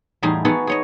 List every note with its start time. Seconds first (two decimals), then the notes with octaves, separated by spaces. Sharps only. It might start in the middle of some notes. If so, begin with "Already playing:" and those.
0.22 E2 A2 G3 D#4 G#4 C6
0.45 B3 D#4 F#4 G#4 A4
0.67 G#4 C#5 D#5